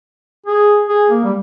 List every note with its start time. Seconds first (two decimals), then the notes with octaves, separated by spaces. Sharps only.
0.46 G#4
0.89 G#4
1.10 A#3
1.24 G3